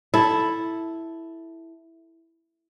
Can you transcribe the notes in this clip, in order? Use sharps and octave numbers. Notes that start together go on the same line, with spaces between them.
E4 A4